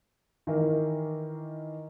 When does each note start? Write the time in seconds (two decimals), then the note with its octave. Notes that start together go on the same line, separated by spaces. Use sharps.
0.47 D#3 E3 A#4